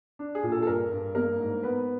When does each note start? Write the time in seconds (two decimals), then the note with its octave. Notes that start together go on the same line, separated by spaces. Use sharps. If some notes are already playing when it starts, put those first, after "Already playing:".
0.19 D4
0.35 G#4
0.43 A#2
0.52 A4
0.62 A4
0.67 G2 A#4
0.91 G2
1.15 A#3 A#4
1.40 G#2
1.63 B3 B4